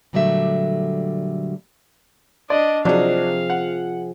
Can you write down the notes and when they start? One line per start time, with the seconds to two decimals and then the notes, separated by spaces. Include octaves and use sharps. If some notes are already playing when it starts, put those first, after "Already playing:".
0.13 A#2 D3 F#3 G3 A3 E5
2.50 D4 D5 D#5
2.85 C3 F3 F#3 D4 D#4 G#4 F5
3.50 F#5